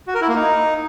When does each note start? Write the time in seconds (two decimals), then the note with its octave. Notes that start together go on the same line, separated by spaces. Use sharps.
0.07 F#4
0.14 A#4
0.21 E4
0.28 A#3
0.35 D#4